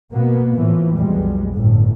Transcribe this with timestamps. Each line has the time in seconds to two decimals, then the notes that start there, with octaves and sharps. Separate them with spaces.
0.11 B2 A#3 B3
0.54 A2 E3 F3
0.94 B1 F2 G3 G#3
1.52 G1 A2